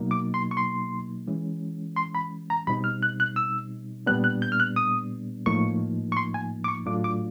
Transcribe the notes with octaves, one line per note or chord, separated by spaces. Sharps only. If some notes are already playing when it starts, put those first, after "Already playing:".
Already playing: B2 F#3 A#3 D#4
D6
C6
C#6
C6
E3 G#3 C#4
C6
B5
A#5
B2 G3 C4 D#4 B5
F6
F#6
F#6
E6
A#2 G3 B3 D4 F#6
F#6
G6
F6
F#6
D#6
A2 F3 A#3 D#4 C#6
C#6
C6
G#5
D6
C#6
A2 F#3 A3 D4 F4 D6
D6